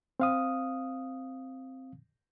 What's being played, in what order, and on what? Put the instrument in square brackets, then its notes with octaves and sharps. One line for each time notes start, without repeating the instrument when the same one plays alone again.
[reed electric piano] C4 F5 D#6